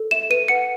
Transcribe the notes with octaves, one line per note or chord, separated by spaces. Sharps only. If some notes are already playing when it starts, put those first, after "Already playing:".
Already playing: A4
E5 E7
B4 D#7
F#5 C#7